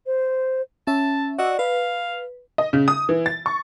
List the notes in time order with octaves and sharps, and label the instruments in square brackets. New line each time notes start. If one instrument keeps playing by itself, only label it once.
[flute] C5
[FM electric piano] C#4 E5 [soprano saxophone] A5
[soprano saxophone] F#4 [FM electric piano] D5 D#5 E6
[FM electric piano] B4 [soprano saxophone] F5
[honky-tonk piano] D#5
C#3
D#6
E3
A6
C#6